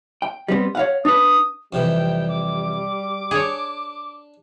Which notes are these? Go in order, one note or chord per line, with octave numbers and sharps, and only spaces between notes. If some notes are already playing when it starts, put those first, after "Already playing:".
G5
G3 B3 C4
C#5 F5 F#5
D4 B4 D#6
F2 C3 E3 G3 G5
D6
D4 G#4 C#5